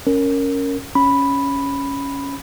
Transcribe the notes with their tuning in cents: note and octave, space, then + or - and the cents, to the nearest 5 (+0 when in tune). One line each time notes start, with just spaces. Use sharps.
C#4 +0 A#4 -10
C#4 +0 B5 +0